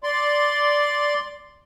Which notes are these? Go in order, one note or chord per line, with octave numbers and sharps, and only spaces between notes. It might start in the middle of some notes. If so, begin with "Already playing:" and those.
D5 C6